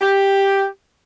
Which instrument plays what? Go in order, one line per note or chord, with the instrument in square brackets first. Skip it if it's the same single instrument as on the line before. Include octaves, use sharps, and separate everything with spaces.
[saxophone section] G4